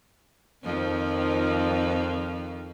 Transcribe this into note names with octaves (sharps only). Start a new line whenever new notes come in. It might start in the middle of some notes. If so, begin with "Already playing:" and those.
F2 D#3 F3